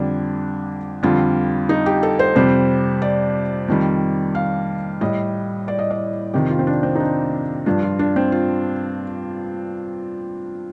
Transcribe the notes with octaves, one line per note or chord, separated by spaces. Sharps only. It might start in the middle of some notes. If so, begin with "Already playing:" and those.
Already playing: F2 D3 G3 D4
F2 D3 G3 F4
D#4
G4
A4
C5
F2 C3 G3 C5
D5
F2 D#3 G3
F5
A2 G3 D#5
D5
D#5
D5
F2 C3 D#3 G4
F4
C4
D4
C4
D#4
D4
G2 F3 D4
F4
D4
C4
F4